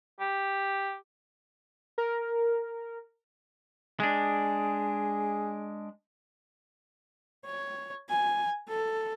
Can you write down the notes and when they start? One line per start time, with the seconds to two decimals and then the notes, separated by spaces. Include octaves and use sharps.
0.20 G4
1.98 A#4
4.00 G#3 D4 G#4
7.45 C#5
8.09 G#5
8.68 A4